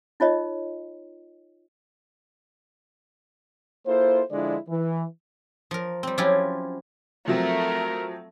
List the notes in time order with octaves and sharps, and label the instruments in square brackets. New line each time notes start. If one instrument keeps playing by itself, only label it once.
[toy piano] D#4 F4 C#5 D#5
[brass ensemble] A#3 E4 F4 A4 C5
D3 F3 G#3 D4 E4 D5
E3
[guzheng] F3 A#4
G3 C4
F3 F#3 C#4 E4 F4 G4
[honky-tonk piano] F3 F#3 C4 [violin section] A3 [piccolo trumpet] A#4